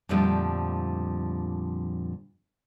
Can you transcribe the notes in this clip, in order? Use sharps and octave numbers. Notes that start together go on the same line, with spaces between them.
F2 A#2 D3 F3 G3 A3